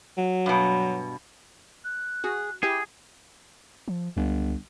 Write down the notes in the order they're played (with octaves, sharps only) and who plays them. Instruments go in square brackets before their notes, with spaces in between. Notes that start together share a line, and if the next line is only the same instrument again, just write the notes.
[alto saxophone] F#3
[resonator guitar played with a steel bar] G2 B2
[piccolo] F#6
[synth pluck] F#4 [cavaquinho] G#4
[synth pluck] E4 G4 [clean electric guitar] G#4 [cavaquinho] G5
[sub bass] F3
[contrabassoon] G1 [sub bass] C#2